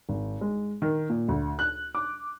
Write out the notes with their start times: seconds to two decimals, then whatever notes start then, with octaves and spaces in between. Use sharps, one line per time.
0.09 G#1
0.41 G#3
0.82 D#3
1.10 A#2
1.28 D2
1.59 F#6
1.95 D6